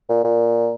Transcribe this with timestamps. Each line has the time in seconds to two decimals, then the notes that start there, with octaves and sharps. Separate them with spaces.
0.09 A#2
0.24 A#2